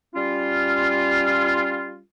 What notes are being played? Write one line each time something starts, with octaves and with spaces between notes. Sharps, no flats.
G3 C#4 F4